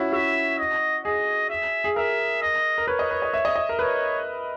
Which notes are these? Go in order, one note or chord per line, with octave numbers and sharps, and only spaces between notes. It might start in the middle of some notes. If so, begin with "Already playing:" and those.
Already playing: C#4 E4 F#4
F#4 E5
D#5
G#4 D#5
E5
G#4
A#4 E5
D#5
A#4
B4 C#5
D#5
B4
D#5
E5
D#5
D#5
A#4
B4 C#5